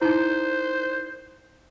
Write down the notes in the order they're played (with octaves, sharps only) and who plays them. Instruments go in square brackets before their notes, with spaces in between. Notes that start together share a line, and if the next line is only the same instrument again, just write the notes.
[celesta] D#4 E4 [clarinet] C5